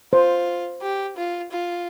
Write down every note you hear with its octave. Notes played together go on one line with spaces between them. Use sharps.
F4 C5
G4
F4
F4